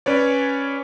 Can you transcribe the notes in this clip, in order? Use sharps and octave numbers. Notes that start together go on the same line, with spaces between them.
C#4 B4 C#5 D5